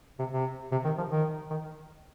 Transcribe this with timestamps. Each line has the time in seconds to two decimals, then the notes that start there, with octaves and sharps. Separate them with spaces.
0.19 C3
0.33 C3
0.72 C3
0.85 D#3
0.98 F3
1.11 D#3
1.50 D#3